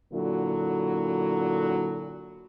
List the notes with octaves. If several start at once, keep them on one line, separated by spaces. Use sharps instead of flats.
A#2 D3 F#3 E4